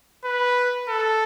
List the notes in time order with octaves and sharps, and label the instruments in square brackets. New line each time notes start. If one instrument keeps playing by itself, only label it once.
[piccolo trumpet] B4
A4